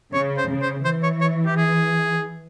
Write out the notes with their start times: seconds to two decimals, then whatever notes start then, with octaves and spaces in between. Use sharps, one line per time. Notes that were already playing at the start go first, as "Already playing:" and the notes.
0.13 C#3 C#5
0.38 C5
0.49 C#3
0.62 C5
0.85 E3 C5
1.03 C#5
1.21 C#5
1.46 G4
1.57 G#4